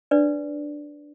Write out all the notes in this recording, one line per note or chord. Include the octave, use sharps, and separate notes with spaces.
D4 B4 D5